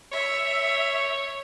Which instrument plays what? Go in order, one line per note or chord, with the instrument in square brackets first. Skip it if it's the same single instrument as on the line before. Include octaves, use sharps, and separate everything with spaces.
[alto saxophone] C#5 [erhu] E5